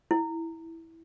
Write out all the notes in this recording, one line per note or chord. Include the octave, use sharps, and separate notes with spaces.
E4